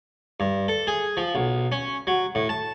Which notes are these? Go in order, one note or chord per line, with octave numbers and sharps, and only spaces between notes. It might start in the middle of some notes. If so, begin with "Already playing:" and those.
G2
A4
G#4
F3
B1
C#4
F#3
A2
A5